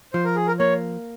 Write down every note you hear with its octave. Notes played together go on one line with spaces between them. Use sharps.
F3 C5
A#4
G#4
A#4
A#3 C#5